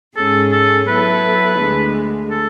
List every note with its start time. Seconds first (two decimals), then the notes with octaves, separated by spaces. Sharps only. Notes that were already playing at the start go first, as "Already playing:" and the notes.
0.17 G#2 G#3 C#4 G#4 A4
0.52 A4
0.88 F#3 B3 E4 A4 B4
1.59 D2 D3 G#3
2.31 A4